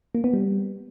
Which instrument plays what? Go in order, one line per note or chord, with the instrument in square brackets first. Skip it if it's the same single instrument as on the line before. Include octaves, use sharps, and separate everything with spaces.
[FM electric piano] A#3
B3
G3